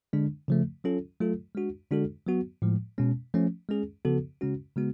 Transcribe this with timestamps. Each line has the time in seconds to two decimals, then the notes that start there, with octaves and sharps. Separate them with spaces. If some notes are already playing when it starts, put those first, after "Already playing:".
0.13 D3 G#3 D4
0.48 C#3 F3 A3
0.84 F#3 C#4 F4 A4
1.20 F#3 A3 F4 A4
1.55 G#3 D4 F#4
1.91 D3 G#3 D4 F#4 A4
2.27 F#3 B3 F#4
2.62 A2 F3 G#3
2.98 B2 G#3 C#4
3.34 F3 A3 C#4
3.69 G#3 C#4 G#4
4.05 C#3 F3 B3 F#4 A4
4.41 C#3 G#3 C#4 F#4
4.76 C#3 G#3 B3 F#4